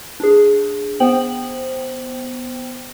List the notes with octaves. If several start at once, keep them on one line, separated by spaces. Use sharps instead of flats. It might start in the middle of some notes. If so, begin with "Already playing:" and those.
D4 G#4
B3 C5 G5 F#7